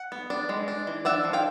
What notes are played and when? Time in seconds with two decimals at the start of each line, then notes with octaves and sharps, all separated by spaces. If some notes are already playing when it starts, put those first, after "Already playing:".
Already playing: F#5
0.12 B3
0.30 D4
0.49 G#3
0.68 D4
0.87 E3
1.05 D4 E5 F#5
1.24 F3
1.33 F5 G5